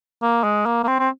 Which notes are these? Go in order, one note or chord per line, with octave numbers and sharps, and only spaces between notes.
A#3
G#3
A#3
A#3
C4
C4